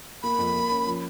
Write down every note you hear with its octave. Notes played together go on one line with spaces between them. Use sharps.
A#3 B5
F2
A#3
C#4
F3